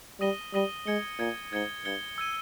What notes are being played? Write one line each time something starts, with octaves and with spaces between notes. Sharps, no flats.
G3 D#6 A#6 D#7 G7
G3 D#6 A#6 D#7 G7
G#3 G#6 C#7 G7
A#2 G#6 C#7 G7
G#2 G#6 C#7 G7
G2 G#6 C#7 G7
E6 G#6 D#7 G7